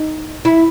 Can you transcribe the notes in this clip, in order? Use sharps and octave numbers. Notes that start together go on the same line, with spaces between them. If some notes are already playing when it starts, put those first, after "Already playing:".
Already playing: D#4
E4